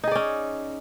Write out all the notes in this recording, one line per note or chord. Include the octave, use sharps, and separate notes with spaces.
C#4 D#4 G#4 D5